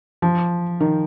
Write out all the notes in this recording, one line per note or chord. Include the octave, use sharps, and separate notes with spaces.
F3
D#3